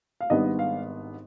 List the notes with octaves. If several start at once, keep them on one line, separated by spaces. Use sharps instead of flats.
F5
G#1 G#2 G3 B3 D4 D#5
F5